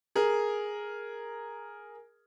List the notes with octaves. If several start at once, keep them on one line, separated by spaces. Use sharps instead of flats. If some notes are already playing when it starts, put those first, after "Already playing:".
G#4 A#4